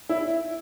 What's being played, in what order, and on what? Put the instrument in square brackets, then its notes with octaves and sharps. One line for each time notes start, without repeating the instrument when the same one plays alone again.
[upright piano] E4